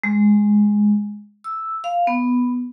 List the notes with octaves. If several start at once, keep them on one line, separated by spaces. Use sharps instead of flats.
G#3
E6
F5
B3